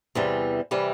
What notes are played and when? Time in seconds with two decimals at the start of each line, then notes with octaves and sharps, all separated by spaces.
0.15 E2 C3 E3 G3
0.71 C3 E3 G3